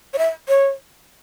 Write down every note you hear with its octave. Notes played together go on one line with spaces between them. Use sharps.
C#5
E5
C#5